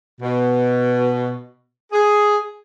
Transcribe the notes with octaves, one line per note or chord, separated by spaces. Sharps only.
B2
G#4